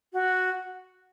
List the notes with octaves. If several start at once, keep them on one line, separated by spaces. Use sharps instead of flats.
F#4